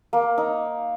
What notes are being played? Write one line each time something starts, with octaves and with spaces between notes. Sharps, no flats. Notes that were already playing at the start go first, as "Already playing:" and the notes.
A#3
D#4